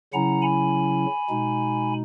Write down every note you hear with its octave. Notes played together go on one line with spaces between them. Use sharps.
C#3 F#3 C#4 E4 F#5 A#5
G#5 B5
B2 G#3 D#4